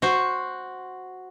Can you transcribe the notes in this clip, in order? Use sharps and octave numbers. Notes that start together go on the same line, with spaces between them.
F#4 C5